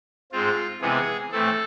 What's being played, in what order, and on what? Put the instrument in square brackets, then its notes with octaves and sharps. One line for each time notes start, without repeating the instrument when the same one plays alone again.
[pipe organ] G#2 G#3 C4 F4
C3 E3 G#3 B3 G#4
A2 E3 A3 C4 A4